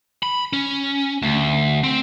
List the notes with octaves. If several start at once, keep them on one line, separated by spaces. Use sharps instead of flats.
B5
C#4
D2
C4